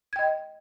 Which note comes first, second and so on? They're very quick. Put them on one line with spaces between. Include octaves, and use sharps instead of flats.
G#6 G5 D#5